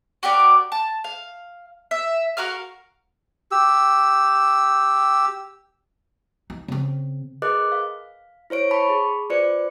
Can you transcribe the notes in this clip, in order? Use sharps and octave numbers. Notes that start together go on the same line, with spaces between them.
F#4 G4 A#4 D5
A5
F5
E5
F#4 A#4 F5 F6
G4 E6
D#4
C#3 C4
G#4 A#4 B4 D#5 D6 F#6
F5
E4 C5 C#5 D7
A5 B5 C#6
G#4
F4 B4 C5 D5 C#7